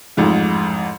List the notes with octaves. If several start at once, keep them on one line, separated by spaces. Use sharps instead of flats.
A1 F2 G#2